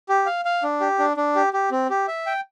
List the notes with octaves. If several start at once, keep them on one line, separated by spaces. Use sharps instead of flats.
G4
F5
F5
D4
G4
D4
D4
G4
G4
C4
G4
E5
G5